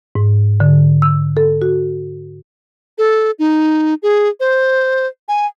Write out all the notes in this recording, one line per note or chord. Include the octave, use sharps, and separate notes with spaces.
G#2
D3
E6
A4
F#4
A4
D#4
G#4
C5
G#5